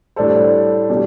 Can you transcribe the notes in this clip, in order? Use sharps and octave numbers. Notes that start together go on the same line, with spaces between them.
A2 G3 D4 A4 C5
B2 G3 D4